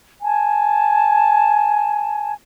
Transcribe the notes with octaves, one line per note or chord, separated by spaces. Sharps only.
G#5 A5